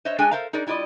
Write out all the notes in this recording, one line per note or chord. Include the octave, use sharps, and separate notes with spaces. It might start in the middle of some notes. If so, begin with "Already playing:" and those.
C5 C#5 D#5 E5
G#3 D4 G#4 A4 G5 G#5
A4 A#4 C5 E5 F5
D#4 G#4 A#4 D5
G3 E4 F4 D5 D#5